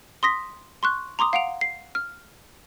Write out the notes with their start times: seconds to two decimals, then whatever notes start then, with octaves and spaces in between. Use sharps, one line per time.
0.23 C6 D#6 A#6 B6
0.83 C6 C#6 F#6
1.19 A#5 C6 D6 D#6
1.33 F5 F#5 D7 F7
1.61 C7
1.95 F6